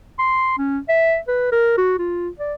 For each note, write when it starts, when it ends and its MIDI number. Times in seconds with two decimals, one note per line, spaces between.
0.19 0.56 84
0.58 0.78 61
0.88 1.18 76
1.28 1.47 71
1.52 1.73 70
1.78 1.98 66
1.99 2.29 65
2.39 2.54 74